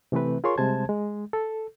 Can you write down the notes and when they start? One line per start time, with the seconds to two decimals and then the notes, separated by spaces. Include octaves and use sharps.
0.12 C3 E3 A3 C4 B4
0.44 F4 G#4 A#4 C#5 C6 C#6
0.58 C3 G3 G#3 C5 A5 G#6
0.89 G#3
1.33 A4